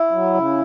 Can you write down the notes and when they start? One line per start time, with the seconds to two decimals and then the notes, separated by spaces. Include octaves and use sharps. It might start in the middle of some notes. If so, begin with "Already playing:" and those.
Already playing: E4
0.11 F#3
0.34 C#3